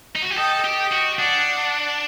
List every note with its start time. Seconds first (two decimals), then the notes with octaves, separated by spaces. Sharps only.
0.16 D#4
0.23 F#4
0.31 G4
0.38 A4 D#5 G5
0.65 G4
0.78 D#5 G5
0.92 F#4
1.19 D4 D5 F#5